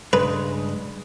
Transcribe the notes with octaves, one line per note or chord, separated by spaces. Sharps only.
G2 C#3 G#3 B4